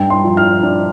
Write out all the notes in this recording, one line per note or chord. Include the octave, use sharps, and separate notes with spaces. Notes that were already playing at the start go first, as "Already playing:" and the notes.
Already playing: G2 G5
C6
F3
F6
D4